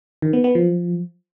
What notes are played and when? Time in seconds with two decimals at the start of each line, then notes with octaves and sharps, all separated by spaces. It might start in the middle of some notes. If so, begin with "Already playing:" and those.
0.22 D#3
0.33 B3
0.44 B3
0.55 F3